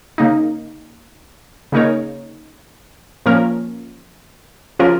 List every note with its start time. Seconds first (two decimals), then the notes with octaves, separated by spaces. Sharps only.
0.18 C#3 A#3 D#4
1.72 C#3 A#3 D#4 A#4 C#5
3.26 A#2 F3 A#3 C#4 A#4
4.79 C#3 F3 C#4 F4 A#4